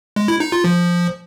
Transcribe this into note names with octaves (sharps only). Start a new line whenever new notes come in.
G#3
E4
D#4
F4
F3